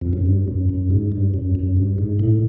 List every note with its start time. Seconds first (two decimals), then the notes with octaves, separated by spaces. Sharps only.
0.01 F2
0.13 F#2
0.26 G2
0.48 F#2
0.69 F#2
0.90 G#2
1.12 G2
1.34 F#2
1.55 F#2
1.77 G2
1.98 G#2
2.19 A2